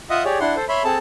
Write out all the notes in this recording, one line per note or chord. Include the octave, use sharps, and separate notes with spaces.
F4 D#5 E5 F#5 D#6
G4 G#4 C#5 D5
D4 E4 F#5 C6
A4 C5
C#5 E5 B5 C6
C4 G#4 A4 A5